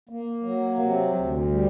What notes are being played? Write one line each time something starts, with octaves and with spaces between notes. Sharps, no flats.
A#3
F#3
C3
D2
G3